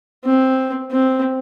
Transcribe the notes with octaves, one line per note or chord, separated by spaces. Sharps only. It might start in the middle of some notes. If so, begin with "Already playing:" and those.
C4
C4